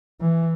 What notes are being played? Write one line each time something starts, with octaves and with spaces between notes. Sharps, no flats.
E3